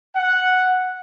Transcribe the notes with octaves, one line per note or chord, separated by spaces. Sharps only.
F#5